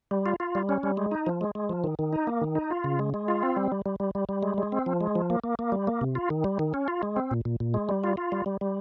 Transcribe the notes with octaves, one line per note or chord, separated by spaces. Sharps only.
G3
F4
F4
G3
C#4
G3
G#3
D#4
F3
G#3
G#3
F3
D#3
D#3
D#4
A#3
D#3
D#4
F4
C#3
G#3
G#3
F4
C4
G3
G3
G3
G3
G3
G3
G#3
G#3
C4
F3
G#3
F3
A#3
A#3
A#3
G3
A#3
C3
F4
D#3
G3
D#3
C#4
F4
G#3
C4
A#2
A#2
A#2
G#3
G3
F4
F4
G3
G3
G3